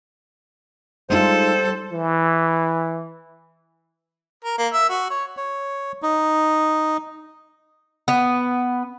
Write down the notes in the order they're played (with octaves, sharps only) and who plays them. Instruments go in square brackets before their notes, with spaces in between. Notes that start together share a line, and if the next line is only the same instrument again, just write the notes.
[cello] G3 A4 [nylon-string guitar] G#3 D#4 F4 [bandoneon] C5
[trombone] E3
[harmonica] A#4
A#3
E5
F#4
C#5
[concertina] C#5
D#4
[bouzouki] B3